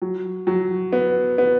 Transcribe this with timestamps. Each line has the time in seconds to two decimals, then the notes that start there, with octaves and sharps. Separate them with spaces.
0.02 F#3
0.47 F#3
0.93 B3
1.38 B3